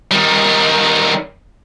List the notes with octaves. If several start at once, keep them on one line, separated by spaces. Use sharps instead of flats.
D#3 G3